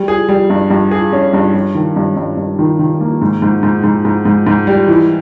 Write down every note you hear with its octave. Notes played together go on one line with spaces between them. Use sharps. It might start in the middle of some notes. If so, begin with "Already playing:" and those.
Already playing: G3
G#4
G3
G2
G2
G#4
C#4
G2
G2
D#3
G2
G2
G2
D#3
D#3
A#3
G#2
G#2
G#2
G#2
G#2
G#2
G#2
G3
E3